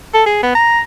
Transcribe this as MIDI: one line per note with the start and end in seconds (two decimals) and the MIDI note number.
0.14 0.25 69
0.26 0.39 68
0.43 0.52 59
0.55 0.80 82